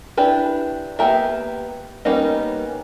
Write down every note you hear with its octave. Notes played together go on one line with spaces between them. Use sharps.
D4 E4 G4 B4
A#3 B3 G4 A#4 E5
G3 A#3 B3 C#4 D#4